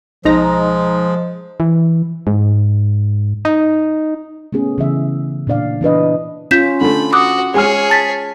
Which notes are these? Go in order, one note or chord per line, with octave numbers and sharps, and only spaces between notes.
B1 F3 G#3 D#4 A#5
E3
G#2
D#4
A3 B3 C#4 G#4
C#3 E3 E5
A#2 D4 D5 F5
E3 D4 B4 D#5
C#4 F4 G6 B6 E7
D3 A3 B5
F#4 D6 D#6 F#6
G#3 G#4 C#5 G#5 F6
A5 A6 B6